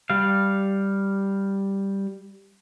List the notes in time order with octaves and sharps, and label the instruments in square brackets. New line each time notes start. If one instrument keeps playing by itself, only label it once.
[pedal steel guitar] G3 F5